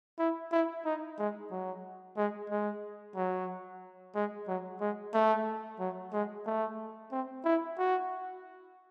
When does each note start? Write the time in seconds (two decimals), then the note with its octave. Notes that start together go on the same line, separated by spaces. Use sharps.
0.19 E4
0.52 E4
0.85 D#4
1.18 G#3
1.51 F#3
2.17 G#3
2.50 G#3
3.16 F#3
4.15 G#3
4.48 F#3
4.81 G#3
5.14 A3
5.79 F#3
6.13 G#3
6.46 A3
7.12 C4
7.45 E4
7.78 F#4